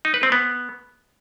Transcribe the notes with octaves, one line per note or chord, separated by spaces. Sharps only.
D#4
B4
C4
B3